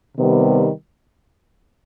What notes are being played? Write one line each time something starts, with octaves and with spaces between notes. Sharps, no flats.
C3 D#3 G3 B3